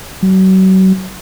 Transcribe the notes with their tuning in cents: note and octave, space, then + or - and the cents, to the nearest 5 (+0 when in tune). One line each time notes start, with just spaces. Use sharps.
F#3 +35